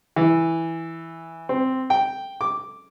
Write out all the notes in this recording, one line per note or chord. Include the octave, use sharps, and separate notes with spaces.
E3
C4
G5
D6